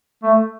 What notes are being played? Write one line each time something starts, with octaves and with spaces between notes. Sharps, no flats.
A3